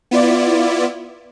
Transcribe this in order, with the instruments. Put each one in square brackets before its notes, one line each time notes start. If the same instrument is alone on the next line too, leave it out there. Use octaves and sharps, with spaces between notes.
[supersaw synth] B3 E4 F4 D5